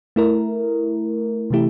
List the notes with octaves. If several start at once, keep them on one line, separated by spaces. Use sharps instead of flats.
A3 E4 A#4
C3 E3 A3 E4 G4